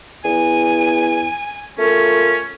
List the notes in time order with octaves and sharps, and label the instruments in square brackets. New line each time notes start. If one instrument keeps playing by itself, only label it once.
[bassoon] E2 [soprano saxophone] G#5
[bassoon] A3 [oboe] C#4 [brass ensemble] F4 A#4